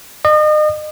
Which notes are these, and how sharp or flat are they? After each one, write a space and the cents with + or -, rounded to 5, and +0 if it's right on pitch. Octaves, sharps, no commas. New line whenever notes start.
D#5 -35